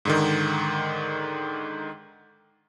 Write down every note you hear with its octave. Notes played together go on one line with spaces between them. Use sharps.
G#2 D3 D#3